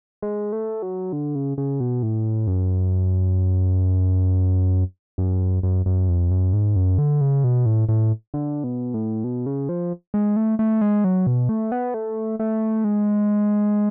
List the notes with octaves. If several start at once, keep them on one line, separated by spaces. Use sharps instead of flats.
G#3
A3
F#3
D3
C#3
C#3
B2
A2
F#2
F#2
F#2
F#2
F2
F#2
G#2
F#2
D3
C#3
B2
A2
A2
D3
B2
A2
B2
C#3
F3
G#3
A3
A3
G#3
F#3
B2
A3
B3
A3
A3
G#3